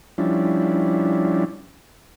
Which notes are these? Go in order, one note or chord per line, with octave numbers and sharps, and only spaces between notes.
F3 G3 C#4 D4 E4